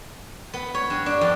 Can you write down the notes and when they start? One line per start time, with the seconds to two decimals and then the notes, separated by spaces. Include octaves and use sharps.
0.54 B3
0.75 C#5
0.90 G2
1.06 D4
1.21 F2